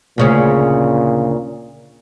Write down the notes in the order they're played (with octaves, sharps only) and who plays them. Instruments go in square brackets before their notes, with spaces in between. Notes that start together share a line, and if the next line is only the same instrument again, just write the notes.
[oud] D2 C#3 C#4 [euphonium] A#2